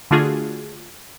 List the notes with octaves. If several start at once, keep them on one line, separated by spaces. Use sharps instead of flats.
D3 A3 D4 F4 F#4 G#4